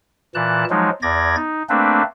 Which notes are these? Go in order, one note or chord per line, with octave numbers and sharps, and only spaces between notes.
A#2 E3 A5 F#6
F3 F#3 G#3 D#4
E2 D5 G#6 A#6
D#4
A3 A#3 C4 D4 B4